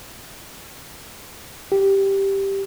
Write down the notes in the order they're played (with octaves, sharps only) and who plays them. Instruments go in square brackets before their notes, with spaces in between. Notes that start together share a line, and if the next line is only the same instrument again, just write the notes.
[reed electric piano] G4